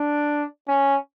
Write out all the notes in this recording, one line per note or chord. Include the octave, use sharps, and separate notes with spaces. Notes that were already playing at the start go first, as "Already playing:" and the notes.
Already playing: D4
C#4